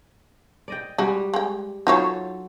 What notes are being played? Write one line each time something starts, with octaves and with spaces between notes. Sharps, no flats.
D5 D#5 G5
G3 G#3 F#4
G#3 G5
F#3 D#4 F4 A4 C5 C#5